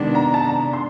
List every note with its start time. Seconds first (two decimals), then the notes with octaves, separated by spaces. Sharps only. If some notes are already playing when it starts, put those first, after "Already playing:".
Already playing: C3 D#3 G#3 B3 D4
0.15 A#5
0.34 A5
0.44 A#5
0.73 C6